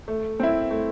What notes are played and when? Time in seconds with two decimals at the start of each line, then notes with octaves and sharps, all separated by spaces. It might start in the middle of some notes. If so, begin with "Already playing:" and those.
0.08 A3
0.40 C4 E4
0.71 A3